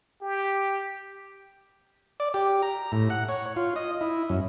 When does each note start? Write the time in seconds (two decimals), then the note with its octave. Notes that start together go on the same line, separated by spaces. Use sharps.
0.21 G4
2.20 D5
2.34 G4
2.62 A#5
2.92 A2
3.10 F#5
3.29 C#5
3.56 F4
3.76 D#5
4.01 E4
4.29 F#2